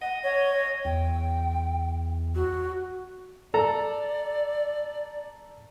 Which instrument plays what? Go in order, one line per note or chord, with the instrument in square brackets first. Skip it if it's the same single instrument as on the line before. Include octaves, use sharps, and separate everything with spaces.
[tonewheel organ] D#5 [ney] F#5
[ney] C#5
[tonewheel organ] E2 [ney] G5
[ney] F#4
[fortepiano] A4 A#5 [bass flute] D5